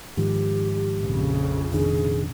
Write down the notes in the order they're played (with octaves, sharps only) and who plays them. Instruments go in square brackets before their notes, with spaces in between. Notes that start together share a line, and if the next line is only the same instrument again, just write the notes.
[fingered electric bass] G#2 D#3 F3 [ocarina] G4
[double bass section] A#1 F2 C#3
[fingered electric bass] F1 D#3 D4 [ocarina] G#4